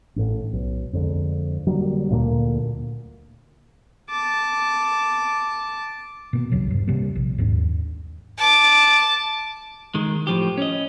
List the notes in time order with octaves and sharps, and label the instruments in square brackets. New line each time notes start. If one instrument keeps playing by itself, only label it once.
[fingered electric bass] A1 A2
B1
F2 D3 G#3
D3 F#3 G3 A#3
D2 A#2 G3 A#3
[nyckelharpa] A5 D6
[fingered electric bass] B2 A#3
B1 E2 C#3 F#3
G2
C3 G3 A#3
A#1
D#2 G#2 A#3 D4
[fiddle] A5 D6
[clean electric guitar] D#3 G#3
A2 F3 G4
C#4 D#5